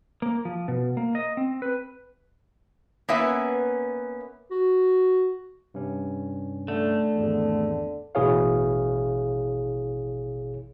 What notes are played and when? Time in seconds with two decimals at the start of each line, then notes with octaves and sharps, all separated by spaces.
0.22 A#3
0.45 F3
0.68 B2
0.97 A#3
1.15 D#5
1.37 C4
1.62 B4
3.09 A#3 B3 C#4 B4 E5
4.51 F#4
5.74 G2 C3 C#4
6.68 D3 A3
7.16 G#1 E2
8.15 A1 B2 E4 G#4 C#5 F5